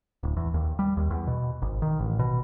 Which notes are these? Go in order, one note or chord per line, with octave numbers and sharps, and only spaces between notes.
D1
E2
D#2
G3
D#2
E2
B2
G#1
D#3
A1
B2